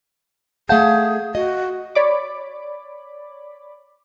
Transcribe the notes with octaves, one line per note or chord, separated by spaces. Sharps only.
A3 G#4 F5 F#5 A5 G6
F#4 D#5
C#5 D5 B5 D6